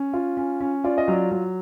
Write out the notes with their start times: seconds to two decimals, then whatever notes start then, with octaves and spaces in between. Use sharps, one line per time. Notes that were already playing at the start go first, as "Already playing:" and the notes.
Already playing: C#4
0.13 F4
0.37 C#4
0.61 C#4
0.84 F4 D5
0.98 D#5
1.08 F#3 D5
1.31 F#3